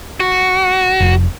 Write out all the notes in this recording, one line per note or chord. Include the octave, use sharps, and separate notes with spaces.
F#4
F1